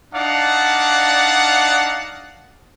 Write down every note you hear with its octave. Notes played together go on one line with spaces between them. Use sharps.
D4 D#4 D5 F5 F#5